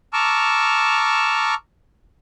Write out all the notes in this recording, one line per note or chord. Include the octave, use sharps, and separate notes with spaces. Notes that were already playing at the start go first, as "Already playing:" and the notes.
A5 A#5 C#6 D6 E6 F6